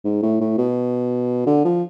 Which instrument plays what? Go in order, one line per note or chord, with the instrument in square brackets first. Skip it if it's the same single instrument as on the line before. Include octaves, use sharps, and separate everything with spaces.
[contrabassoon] G#2
A2
A2
B2
D3
F3